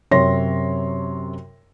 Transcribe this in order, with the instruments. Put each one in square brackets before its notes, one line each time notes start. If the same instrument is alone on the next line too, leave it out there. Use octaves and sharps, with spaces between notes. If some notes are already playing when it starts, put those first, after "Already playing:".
[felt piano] F#2 C3 C#5 C6 A#6